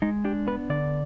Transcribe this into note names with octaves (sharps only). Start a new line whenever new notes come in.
G#3 D#4
D4 G4
B3 B4
D3 D5